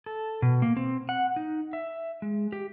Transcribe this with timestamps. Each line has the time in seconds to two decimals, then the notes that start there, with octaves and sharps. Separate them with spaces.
0.06 A4
0.42 B2
0.62 A#3
0.77 C4
1.09 F#5
1.36 D#4
1.73 E5
2.22 G#3
2.52 G4